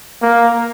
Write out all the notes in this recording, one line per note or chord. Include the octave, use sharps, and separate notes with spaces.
A#3